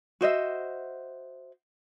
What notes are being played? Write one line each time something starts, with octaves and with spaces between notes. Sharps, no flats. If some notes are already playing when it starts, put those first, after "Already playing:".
F#4 C5 D#5 E5